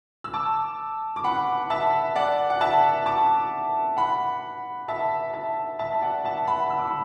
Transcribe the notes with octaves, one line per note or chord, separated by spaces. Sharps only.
E6
A5 D6
D6
F#5 B5
E5 A5
D5 F#5
F#5
E5 A5
A5 D6
F#5 B5
E5 A5
E5 A5
E5 A5
A5
D5 F#5
E5 A5
F#5 B5
E6
D6
B5